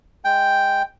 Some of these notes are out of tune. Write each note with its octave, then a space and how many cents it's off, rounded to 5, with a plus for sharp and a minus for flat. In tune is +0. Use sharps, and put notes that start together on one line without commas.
G#3 +0 G5 +0